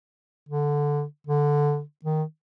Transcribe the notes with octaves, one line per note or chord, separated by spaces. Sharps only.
D3
D3
D#3